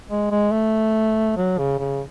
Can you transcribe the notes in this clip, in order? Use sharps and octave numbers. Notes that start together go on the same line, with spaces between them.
G#3
G#3
A3
F#3
C#3
C#3